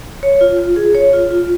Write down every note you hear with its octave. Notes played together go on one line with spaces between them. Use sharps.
C#5
F4
F4
G#4
C#5
F4
F4